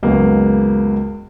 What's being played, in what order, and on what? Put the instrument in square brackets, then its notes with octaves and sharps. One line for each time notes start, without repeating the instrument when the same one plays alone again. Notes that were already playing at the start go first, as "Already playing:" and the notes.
[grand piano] C#2 F#2 G#3 A#3 B3